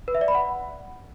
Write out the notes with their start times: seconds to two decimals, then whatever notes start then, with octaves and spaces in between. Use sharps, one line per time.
0.08 B4
0.15 E5
0.21 D5
0.28 B5
0.35 F#5